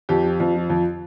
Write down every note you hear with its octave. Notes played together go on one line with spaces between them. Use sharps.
F2 G4
F3
F2
F3
F2